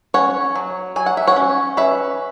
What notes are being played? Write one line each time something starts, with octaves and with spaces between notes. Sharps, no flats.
C#4 C#5 F#5
F#3
F#3 G#5
F#5
E5
C#5 F#5
C#4
C#4 B4 E5